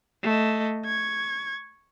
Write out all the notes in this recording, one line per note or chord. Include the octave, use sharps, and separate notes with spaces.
A3 D#5
C#6 G#6